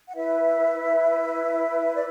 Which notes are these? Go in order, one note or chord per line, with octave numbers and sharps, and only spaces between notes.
F#5
E4 B4 E5
D5